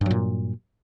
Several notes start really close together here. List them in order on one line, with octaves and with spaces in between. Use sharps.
G2 F#3 A#2